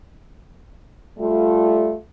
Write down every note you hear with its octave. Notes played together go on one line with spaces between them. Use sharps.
G3 A3 F4